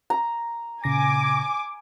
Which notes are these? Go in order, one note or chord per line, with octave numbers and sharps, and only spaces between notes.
A#5
A#2 C#3 G#5 D6 A#6